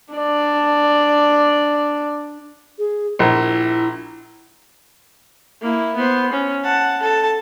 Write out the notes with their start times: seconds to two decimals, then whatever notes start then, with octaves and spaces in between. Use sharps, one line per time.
0.14 D4 D5
2.78 G#4
3.19 A#1 E4
5.61 A#3 E4
5.96 B3 C5
6.33 C#4
6.64 F#5 A5
7.02 A4 A5